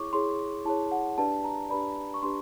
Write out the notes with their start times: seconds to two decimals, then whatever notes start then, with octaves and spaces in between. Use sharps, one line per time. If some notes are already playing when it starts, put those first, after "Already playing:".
Already playing: E4 G#4 C#5 C#6 D6
0.13 E4 G#4 C#5 C6
0.65 E4 G#4 C#5 A5
0.92 F#5
1.18 D4 G4 B4 D5 A5
1.44 A#5
1.70 D4 G4 B4 D5 B5
2.14 C#6
2.23 D4 G4 B4 C6